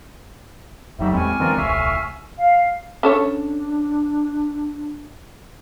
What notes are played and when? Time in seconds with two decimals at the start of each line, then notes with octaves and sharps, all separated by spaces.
0.99 F1 A2 F#3 G3 D#4 E5
1.13 E2 G#3 C4 G#5 C#6 F6
1.40 E3 G#3 C4 D4 F4 A#4
1.58 D#1 C2 A2 E5 F5
2.37 F5
3.03 C#4 D4 A4 C#5